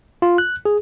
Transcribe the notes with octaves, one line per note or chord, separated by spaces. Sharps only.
F4
F#6
G#4